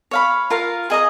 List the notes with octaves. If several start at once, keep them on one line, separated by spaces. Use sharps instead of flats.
C#5 F5 B5
F4 A#4 F5
G#4 D#5 A#5 D#6